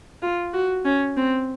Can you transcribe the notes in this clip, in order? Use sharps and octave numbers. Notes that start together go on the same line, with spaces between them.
F4
F#4
C#4
C4